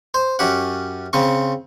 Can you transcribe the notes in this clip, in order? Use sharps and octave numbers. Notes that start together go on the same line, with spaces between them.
C5
F#2 C#4 G4 F#5
C#3 C4 C#6